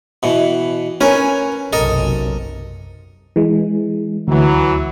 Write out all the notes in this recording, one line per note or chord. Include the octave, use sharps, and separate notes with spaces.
B2 E3
C#4 A#4 B4 G#5
F#1 B1 C3 A4 A#4 D#5
E3 G#3
D2 E3 F#3